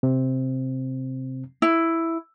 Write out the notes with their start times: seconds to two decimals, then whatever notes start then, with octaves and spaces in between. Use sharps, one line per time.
0.03 C3 C4
1.62 E4